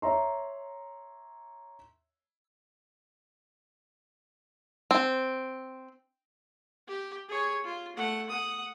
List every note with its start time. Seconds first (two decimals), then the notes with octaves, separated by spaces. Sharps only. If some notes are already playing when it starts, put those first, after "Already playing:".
0.02 C#5 E5 A#5 C6
4.91 C4
6.88 G4
7.28 G#4 C#5
7.64 F4
7.96 A3 F#5
8.30 F#5 D#6